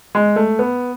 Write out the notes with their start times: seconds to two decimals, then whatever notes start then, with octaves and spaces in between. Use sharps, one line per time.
0.15 G#3
0.36 A3
0.59 B3